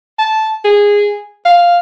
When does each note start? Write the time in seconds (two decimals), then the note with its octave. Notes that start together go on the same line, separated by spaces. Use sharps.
0.19 A5
0.65 G#4
1.45 F5